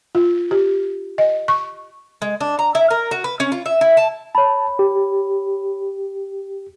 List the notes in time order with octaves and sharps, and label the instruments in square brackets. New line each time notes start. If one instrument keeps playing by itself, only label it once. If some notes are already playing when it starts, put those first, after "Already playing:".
[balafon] F4
G4
D#5
C#6
[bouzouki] G#3
D4
A#5
E4
A#4
F#4
B4
C#4
F4
E5
E4
A5
[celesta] C#5 B5 [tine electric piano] A5
[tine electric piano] G4